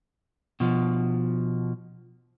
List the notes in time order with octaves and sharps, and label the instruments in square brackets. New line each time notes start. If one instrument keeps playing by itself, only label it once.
[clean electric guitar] B2 F3